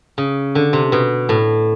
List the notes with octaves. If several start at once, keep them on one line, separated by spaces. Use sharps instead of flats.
C#3
D3
C3
B2
A2